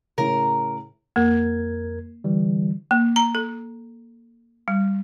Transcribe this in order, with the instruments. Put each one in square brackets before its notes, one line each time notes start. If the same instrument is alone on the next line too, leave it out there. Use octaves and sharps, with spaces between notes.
[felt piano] A2 C#3 [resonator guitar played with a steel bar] A#4
[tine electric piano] F2 A#4 G#6 [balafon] A#3
[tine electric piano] D3 E3 G3
[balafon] A#3
A#5
A4
G3